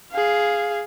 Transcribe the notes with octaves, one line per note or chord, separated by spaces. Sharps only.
G#4 F5